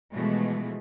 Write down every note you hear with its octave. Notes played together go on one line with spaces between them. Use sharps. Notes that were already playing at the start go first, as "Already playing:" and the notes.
B2 E3 F3 G#3 A3